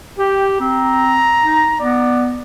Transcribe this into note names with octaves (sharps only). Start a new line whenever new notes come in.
G4 G5
C4 A#5
D#4
B3 D5